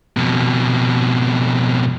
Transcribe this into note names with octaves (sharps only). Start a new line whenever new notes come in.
F2 B2